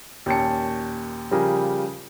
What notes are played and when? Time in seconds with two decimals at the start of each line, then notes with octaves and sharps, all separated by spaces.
0.26 D#2 A#2 C#4 G5 A5 C#7
1.31 C#3 F3 G3 G4 G#4 A#4